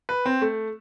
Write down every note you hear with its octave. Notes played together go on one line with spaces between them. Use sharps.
B4
C4
A3